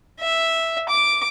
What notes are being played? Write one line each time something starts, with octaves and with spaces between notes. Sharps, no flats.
E5
D6